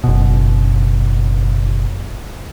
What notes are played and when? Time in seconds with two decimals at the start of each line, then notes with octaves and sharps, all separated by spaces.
0.04 F#1 B2